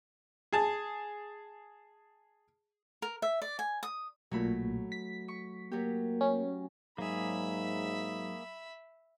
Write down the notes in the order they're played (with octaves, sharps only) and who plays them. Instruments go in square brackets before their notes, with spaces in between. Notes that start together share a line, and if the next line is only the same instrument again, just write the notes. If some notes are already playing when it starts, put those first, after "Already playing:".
[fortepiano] G#4 A5
[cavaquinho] A#4
E5
D5
G#5
D#6
[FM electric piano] B1 A#2 [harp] F#3 A3 B5
[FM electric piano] B6
[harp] C#6
[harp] F#3 G4 [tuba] A#3
[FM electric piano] C#4
[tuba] G#2 [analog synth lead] F#3 [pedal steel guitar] A#3 G#4 [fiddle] E5 B5